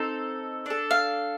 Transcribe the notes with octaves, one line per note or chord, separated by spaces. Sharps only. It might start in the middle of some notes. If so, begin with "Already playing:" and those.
Already playing: C4 D#4 A4
D4 A4
F5